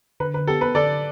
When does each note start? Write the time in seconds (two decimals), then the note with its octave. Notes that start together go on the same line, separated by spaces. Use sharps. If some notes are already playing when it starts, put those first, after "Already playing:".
0.20 D3 B4
0.34 B4
0.47 B3 G4 A4
0.61 B4
0.75 D3 A4 D5